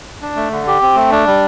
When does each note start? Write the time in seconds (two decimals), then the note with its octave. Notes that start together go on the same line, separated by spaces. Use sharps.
0.22 D4
0.36 A3
0.52 D3
0.67 G4
0.82 C4
0.96 A3
1.12 D4
1.27 G3